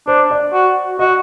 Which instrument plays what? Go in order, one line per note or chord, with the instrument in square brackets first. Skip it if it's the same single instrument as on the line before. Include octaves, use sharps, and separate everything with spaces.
[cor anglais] D4 [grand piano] C5
[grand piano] D5
[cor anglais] F#4
[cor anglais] F#4 [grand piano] D#5